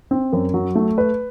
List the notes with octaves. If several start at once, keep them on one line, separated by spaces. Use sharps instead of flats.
C4
F#2
F#3
A3
B4